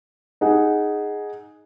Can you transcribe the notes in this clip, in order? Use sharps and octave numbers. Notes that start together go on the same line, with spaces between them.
D#4 G#4 F#5